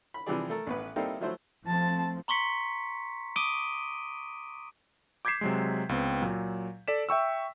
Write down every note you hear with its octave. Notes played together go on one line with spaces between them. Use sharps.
B5
C3 E3 F3 G3 G#4 D5
A3 A4 A#4
A1 B3 B4
G3 A#3 C4 D#4 E4 A4
F3 F#3 A3 E4 C5
F3 A3 C4 A5
A#5 C6 C#6 B6 C#7
D6 D#6 D7 D#7 G7
D6 G6 G#6 B6 C7 E7
C3 F#3 G#3
C#2 B3 C4
A#2 F#3
A4 D5 B6 E7
E5 G5 C#6 E6